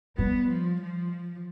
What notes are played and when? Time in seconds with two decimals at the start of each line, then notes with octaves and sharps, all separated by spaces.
0.18 G3 B3
0.50 F3
0.82 F3